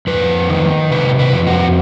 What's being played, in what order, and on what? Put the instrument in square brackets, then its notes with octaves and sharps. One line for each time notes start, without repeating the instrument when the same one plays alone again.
[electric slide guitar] F2 B4
D#3
C3 B4
B4
F2
F#4